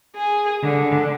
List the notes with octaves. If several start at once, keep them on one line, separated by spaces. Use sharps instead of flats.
G#4
D3